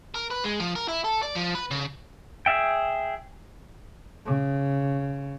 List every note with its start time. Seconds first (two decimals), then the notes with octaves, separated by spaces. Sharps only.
0.15 A#4
0.31 B4
0.45 G#3
0.60 F3
0.76 A#4
0.88 E4
1.04 A4
1.22 D5
1.35 F3
1.55 B4
1.71 C#3
2.46 G#4 E5 G5
4.26 C#3